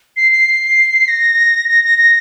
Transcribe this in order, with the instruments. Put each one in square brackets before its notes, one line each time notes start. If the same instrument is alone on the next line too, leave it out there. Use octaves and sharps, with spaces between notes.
[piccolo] C7
C7
A#6
A#6
A#6
A#6